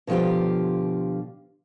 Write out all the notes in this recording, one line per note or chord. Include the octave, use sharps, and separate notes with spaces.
B2 D3 F3 F4 G4